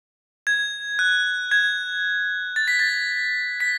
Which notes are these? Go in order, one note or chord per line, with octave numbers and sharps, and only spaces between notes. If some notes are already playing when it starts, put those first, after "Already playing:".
G#6
F#6
G#6
A6
B6
A6
B6